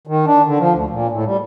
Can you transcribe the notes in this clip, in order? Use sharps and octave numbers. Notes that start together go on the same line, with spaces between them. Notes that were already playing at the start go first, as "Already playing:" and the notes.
D#3
D4
D3
F3
D2
A#2
A2
G3